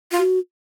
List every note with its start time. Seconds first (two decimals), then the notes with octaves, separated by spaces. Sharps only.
0.11 F4
0.18 F#4